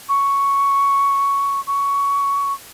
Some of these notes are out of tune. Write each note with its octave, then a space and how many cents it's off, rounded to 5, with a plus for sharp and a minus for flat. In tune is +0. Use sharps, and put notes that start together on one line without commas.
C#6 +5
C#6 +15